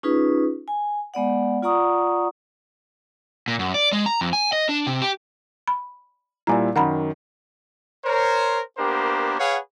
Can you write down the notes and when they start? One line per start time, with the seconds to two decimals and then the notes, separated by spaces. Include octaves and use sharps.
0.03 C#4 D#4 F4 G#4 B4
0.68 G#5
1.14 G#3 B3 D5 F#5
1.63 F4 D5 F#5 A#5 C#6 D#6
3.48 A#2
3.59 F#2
3.74 D5
3.92 G#3
4.06 A#5
4.21 F2
4.33 G#5
4.53 D#5
4.69 D4
4.87 C3
5.02 G4
5.68 B5
6.47 A#2 G3 E4 D5 G#5 A#5
6.76 F#2 D#3 F#5 A#5 B5
8.05 A#4 C5 C#5
8.78 A#3 B3 D4 G4 A#4 C5
9.39 G#4 B4 C#5 F5 F#5